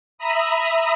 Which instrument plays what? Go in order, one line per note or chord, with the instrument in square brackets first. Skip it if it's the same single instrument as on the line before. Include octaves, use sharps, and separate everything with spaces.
[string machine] E5 A#5 B5 D#6